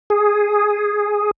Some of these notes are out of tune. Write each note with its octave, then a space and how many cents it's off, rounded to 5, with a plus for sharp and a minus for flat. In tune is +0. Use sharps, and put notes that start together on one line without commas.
G#4 +0